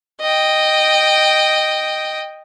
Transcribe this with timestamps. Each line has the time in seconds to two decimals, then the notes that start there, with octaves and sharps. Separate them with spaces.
0.21 D#5 G5